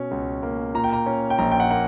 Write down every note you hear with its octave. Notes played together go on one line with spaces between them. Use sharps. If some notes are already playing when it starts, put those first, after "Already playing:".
Already playing: B2 C#4
C#2
A#3
A#2 A#5
G5
A#5
C#4
G5
A#1 A#5
G5
F#5
A#3 F#5